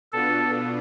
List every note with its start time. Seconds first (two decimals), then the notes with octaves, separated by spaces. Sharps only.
0.12 B2 B3 D4 F4 A4